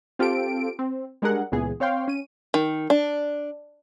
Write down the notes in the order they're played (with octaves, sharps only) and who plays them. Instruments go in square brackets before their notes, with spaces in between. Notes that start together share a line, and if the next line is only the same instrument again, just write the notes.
[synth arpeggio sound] C4 F4 G4 A4 D7
C4
G3 G#3 D4 G#4 A#4 F#5
C#2 A#2 E3 B3 G#4
C4 C#5 F5 G5 C6
C#4 D#7
[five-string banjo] D#3
D4